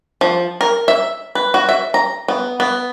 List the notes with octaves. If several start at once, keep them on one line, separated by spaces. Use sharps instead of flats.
F3
A#4
E5
B4
F#4
E5
A#5
B3
B3